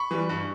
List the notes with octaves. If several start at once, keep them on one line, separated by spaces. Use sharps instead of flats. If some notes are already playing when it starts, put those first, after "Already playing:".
Already playing: B5 C#6
E3 G3
G2